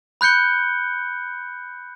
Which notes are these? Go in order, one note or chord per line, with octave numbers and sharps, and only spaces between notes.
B5 F#6 G6 C#7 G7